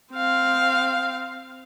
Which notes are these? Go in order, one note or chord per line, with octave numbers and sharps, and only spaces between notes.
C4 F5